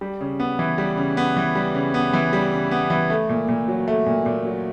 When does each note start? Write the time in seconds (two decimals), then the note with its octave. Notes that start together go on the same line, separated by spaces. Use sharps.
0.01 G3
0.21 C#3
0.40 B3
0.59 E3
0.78 G3
0.97 C#3
1.17 B3
1.36 E3
1.55 G3
1.75 C#3
1.94 B3
2.13 E3
2.33 G3
2.52 C#3
2.71 B3
2.90 E3
3.10 A3
3.29 A#2
3.49 A#2
3.68 F#3
3.88 A3
4.06 A#2
4.26 A#2
4.45 F#3